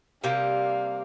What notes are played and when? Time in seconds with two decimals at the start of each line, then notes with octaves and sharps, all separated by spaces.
0.23 C3 G3 A#3 F5